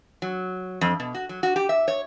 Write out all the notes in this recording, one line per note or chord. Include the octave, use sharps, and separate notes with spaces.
F#3
F2
B2
F#4
F#3
F#4
G4
E5
C#5